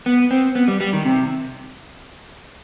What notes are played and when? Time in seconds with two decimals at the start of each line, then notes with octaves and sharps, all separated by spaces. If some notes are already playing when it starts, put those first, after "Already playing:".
0.06 B3
0.31 C4
0.55 B3
0.68 G3
0.81 G3
0.93 D#3
1.05 C3